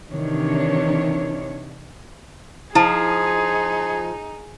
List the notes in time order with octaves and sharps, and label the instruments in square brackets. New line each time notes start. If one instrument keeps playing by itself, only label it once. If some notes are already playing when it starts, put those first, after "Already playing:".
[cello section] C3 D#3 E3 D4 C#5
[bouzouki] F3 [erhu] D#4 [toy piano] E4 A5 [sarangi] G#4